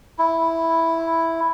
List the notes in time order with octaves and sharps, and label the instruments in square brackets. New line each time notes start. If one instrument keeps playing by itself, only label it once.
[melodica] E4